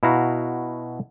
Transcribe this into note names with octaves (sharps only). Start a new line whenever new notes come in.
B2 E4 F#4 F5 A#5